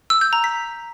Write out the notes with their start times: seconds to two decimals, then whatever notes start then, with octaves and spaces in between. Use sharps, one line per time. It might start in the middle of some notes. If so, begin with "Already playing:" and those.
0.10 E6
0.21 G6
0.33 A#5
0.44 B6